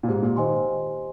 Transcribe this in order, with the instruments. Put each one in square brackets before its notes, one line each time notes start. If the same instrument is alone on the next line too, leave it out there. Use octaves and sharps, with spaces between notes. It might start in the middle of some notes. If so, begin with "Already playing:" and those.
[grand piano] A#2
[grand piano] G#2 [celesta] G4
[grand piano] A#2
[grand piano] D#3 [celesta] C5 D#5 G#5 C6